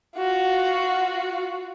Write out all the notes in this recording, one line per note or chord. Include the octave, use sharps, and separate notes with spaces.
F4 F#4